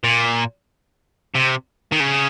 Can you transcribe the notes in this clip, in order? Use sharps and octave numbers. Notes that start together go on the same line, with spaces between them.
A#2
C3
D#3
C#3